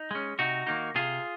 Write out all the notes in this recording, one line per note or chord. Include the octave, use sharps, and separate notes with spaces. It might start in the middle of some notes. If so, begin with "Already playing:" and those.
Already playing: D#4
G#3 C#4
C3 D#4 F#4
D#3 A#3 D#4
C3 F4 G#4